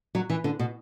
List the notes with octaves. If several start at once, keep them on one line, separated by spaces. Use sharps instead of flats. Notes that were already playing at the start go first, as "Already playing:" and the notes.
F#3
E3
D3
B2